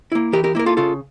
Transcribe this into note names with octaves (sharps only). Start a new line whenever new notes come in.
A#3 E4
E3 G4 A#4
G4 A#4
A#3 E4 A#4
F4 A4
C#3 F4 A4